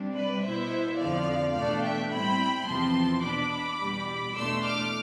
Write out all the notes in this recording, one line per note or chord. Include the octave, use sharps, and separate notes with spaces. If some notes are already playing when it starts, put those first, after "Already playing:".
Already playing: C3 G3 D4
B4 D5
B2 B3 E4 C5 E5
F2 D3 F3 D5 F5
E2 B2 A3 D4 D5 F5
E5 G5
A2 G3 C4 E4 G5 B5
E2 C3 F3 C4 A5 C6
B2 B3 D4 B5 D6
E2 B2 G3
E2 B2 A3 D4 C6 E6
D6 F6